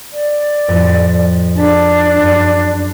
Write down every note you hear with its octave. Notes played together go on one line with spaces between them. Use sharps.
D5
F2 A2
D4 G#4 A5 B6
F#2 C6